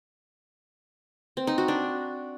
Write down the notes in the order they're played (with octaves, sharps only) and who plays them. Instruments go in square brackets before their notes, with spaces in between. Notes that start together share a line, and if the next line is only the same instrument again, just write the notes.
[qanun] C4
D#4
F#4
D4